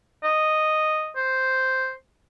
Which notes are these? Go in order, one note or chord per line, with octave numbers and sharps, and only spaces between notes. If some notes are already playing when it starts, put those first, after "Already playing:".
D#5
C5